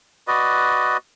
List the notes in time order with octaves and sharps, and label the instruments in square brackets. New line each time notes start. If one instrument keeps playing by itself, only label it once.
[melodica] F#4 B4 D5 D#5